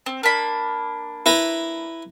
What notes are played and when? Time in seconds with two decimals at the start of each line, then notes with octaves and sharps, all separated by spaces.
0.06 C4
0.23 A#3 D4 B5
1.26 E4 B4 A#5